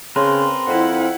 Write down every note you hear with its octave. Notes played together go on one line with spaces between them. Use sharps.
C#3 C4 A#4 B4 C6
F2 E4 F#5